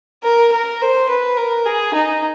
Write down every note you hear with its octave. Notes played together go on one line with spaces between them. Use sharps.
A#4
A#4
C5
B4
A#4
G#4
D#4